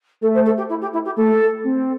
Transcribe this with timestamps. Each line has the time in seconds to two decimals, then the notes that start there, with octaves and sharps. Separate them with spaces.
0.21 A3 A4
0.33 C5
0.45 A4
0.57 G4
0.69 E4
0.81 G4
0.93 E4
1.05 G4
1.16 A3 A4
1.64 C4